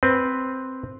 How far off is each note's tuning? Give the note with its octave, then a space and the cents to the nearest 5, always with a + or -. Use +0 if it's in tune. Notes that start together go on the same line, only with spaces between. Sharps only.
C4 +0 B4 +0